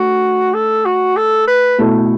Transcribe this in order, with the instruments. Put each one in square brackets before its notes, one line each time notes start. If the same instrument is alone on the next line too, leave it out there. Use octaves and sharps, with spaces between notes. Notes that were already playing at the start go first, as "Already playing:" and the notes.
Already playing: [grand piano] A3 D4 [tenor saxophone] F#4
[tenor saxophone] A4
F#4
A4
B4
[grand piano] B2 A3 E4 A4